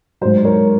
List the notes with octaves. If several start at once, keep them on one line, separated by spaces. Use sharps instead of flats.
G#2 F#3 C5
A#4 C#5